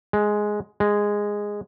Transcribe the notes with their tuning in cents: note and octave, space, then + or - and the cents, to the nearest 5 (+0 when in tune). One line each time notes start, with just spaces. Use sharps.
G#3 +5
G#3 -10